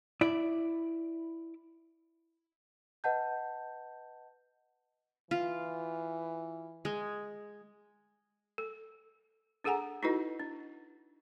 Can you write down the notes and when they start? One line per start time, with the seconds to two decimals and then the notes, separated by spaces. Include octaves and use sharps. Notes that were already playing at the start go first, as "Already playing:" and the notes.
0.21 E4 D5
3.04 B4 D#5 F#5 A5 G6
5.31 E3 F4
6.85 G#3
8.58 A4
9.64 D4 G#4 A4 F#5 G#5 A#5
10.03 D#4 E4 F#4 A4 B4 D#5
10.40 D4